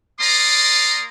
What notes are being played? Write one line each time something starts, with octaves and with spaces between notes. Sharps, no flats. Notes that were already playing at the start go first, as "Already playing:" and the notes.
A#3 A#4 D5 A#5 C6 D#6